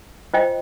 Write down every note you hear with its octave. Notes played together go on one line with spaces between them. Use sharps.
F4 C5 D#5 G5